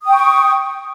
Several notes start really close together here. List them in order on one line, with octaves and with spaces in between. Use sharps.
D#6 G5 C#6